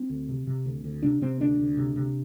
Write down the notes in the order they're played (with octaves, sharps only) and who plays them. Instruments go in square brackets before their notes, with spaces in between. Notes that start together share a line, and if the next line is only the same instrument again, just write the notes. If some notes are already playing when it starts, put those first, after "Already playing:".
Already playing: [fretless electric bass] C4
D2
C3
C3
D2
D2
C3 D4
C3 C4
D2 D4
D2
C3
C3